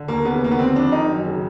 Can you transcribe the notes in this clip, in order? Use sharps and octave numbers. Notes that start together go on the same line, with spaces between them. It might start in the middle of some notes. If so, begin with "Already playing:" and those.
Already playing: D3
D#2 A#3
C#3 B3
D#2 A#3
B3
D3 C4
F2 D4
D#3 D#4
F#2
C#3